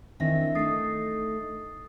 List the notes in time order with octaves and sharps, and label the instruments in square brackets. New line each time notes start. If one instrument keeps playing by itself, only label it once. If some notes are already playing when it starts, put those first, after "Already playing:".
[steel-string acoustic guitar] D#3 E3 C4 [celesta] D4 E5 A#6
[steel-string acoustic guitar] A3 D#4 [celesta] D#6 A6 C7